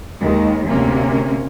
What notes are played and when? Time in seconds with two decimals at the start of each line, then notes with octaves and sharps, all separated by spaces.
0.22 D#2 D#3 G#3
0.67 D2 C3 A#3 C#4